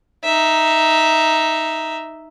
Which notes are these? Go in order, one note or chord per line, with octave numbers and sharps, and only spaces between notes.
D#4 E5